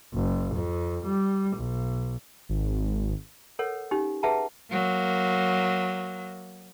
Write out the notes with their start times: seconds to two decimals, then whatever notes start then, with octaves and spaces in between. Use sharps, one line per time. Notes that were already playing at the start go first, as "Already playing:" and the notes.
0.14 F#1
0.55 F2
1.06 G3
1.57 B1
2.49 G#1
3.59 A4 A#4 C#5 F#5
3.91 C#4 D#4 G4
4.23 G#4 B4 E5 F#5 A5 A#5
4.71 F#3 A#3